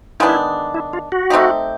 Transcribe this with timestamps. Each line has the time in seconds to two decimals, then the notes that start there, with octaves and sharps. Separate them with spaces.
0.20 D#3 G#3 B3 D4 E4
0.74 E4
0.93 F4
1.12 F#4
1.30 A3 C4 D#4 G4